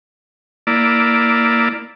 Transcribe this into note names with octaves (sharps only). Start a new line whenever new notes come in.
A#3 E4 D5